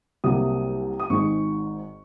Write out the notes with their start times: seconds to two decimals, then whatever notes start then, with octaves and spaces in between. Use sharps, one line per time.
0.24 C2 C3 F#3 A#3 D#6
1.00 D#6
1.10 G#1 G#2 D#3 G#3 C#6